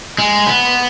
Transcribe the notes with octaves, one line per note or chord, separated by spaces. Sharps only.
G#3
B3